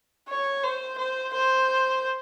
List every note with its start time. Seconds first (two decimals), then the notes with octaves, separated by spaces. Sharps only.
0.28 C#5
0.63 C5
0.98 C5
1.34 C5